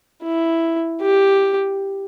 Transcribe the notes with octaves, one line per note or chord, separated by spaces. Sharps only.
E4
G4